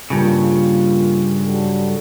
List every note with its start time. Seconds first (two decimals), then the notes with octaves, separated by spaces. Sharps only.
0.10 G2 C#3 A#3 F4
1.46 F#3 G3 A4